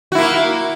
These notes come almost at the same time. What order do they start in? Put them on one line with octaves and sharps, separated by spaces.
F#4 E4 A#3